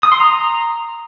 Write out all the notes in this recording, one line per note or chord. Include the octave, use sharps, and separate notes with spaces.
D#6
C6
A#5